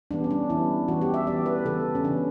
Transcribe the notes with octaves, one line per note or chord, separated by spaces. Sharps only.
E3 G3 B3 D4
C#4
D4
E3 G3 B3 E4
E3 B3 F#4
G4
E5
E3 B3 D5
B4
C#3 E3 B3 A4
C#4
C#3 E3 B3 D4